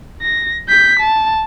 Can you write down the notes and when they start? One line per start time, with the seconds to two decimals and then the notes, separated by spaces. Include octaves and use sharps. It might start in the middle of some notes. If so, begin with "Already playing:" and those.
0.22 A#6
0.69 G6 B6
1.00 A5